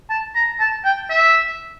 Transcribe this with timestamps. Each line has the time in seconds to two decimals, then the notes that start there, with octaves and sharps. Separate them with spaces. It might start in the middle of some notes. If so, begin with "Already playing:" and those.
0.10 A5
0.35 A#5
0.60 A5
0.85 G5
1.10 E5